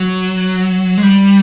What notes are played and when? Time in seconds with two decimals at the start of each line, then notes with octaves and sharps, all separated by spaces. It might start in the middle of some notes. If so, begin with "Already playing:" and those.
Already playing: F#3
0.98 G#3
1.03 G3